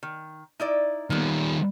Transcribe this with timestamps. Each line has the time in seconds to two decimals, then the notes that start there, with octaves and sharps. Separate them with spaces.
0.03 D#3
0.60 D#4 E4 D5
1.10 D#3 G3 A#3 B3